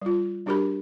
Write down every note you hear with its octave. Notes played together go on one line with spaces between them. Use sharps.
G3 F4
G3 D4 F#4 G4 A#4 B5